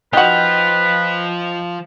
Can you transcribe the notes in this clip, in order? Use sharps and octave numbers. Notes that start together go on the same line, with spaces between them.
F3 D#4 F4 F#4 B4 D#5 G5